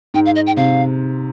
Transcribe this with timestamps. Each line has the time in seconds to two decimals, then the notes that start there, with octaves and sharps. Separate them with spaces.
0.14 G#2 G5
0.26 F5
0.36 D#5
0.47 G5
0.57 C3 F5